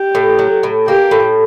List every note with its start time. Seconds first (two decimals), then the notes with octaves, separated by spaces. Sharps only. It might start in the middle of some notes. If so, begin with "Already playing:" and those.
Already playing: G4
0.15 A2
0.39 F#3
0.63 A2
0.87 A#3 G4
1.11 A2